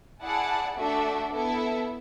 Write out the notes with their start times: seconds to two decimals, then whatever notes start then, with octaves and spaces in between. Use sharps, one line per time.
0.22 E4 G#4 D5 F#5 A5
0.78 A3 D4 F#4 A4 E5
1.34 B3 E4 A4 E5